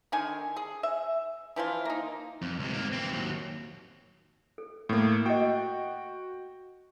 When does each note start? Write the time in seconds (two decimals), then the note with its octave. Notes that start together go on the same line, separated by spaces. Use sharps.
0.12 D3 D#3 G#5
0.56 G#4
0.83 E5
1.56 E3 F3 E4 F4
1.85 A#3 D#4
2.42 F2
2.59 C#2 C3
2.73 G#2 A#3
2.93 E3 C4
3.10 D#2 F#3
4.58 A4
4.89 A2 A#3
5.25 F#4 G4 A#4 D#5 G5